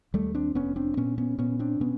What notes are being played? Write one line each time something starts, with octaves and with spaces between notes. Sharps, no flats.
D#2 G3 A3
C4 D4
F1 B3 C#4
C4 D4
A#2 B3 C#4
B3 C#4
A#2 B3 C#4
C4 D4
B2 B3 C#4